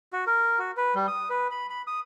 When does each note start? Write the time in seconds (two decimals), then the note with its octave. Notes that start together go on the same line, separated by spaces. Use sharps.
0.13 F#4
0.27 A#4
0.59 F#4
0.77 B4
0.95 G3
1.08 D#6
1.30 B4
1.51 B5
1.70 B5
1.87 D#6